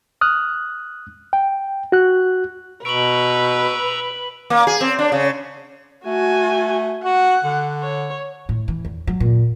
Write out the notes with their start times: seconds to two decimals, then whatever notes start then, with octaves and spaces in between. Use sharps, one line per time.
0.21 D#6 F6 F#6
1.33 G5
1.92 F#4 F#6
2.85 B2 B4 A#5 C#6 E6 D7 F#7
4.50 A#3
4.67 G#4
4.81 C4
4.99 D4
5.12 C#3
6.06 A3 F#4 G#5
7.05 F#4 F#5
7.44 D3
7.82 C#5
8.49 A2
8.68 E3
8.85 E2
9.07 F#3
9.20 A#2